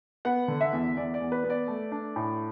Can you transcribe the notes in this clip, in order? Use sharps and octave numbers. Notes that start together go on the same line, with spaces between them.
B3 F#5
D3
E5
E2
E2 D5
D5
E2
B4
B3
D5
A3
D4
A2